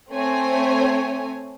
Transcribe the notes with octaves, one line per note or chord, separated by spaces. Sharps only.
A3 C4 C#5 G#5